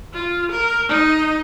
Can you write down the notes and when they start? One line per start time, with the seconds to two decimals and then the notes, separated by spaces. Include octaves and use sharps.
0.14 F4
0.52 A#4
0.89 D#4 D#5